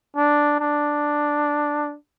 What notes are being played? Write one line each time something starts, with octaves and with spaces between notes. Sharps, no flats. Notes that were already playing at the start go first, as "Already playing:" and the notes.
D4
D4